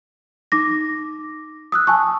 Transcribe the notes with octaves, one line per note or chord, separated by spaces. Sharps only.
D#4 D6 A#6
D#6 E6 F#6
G#5 A5 C#6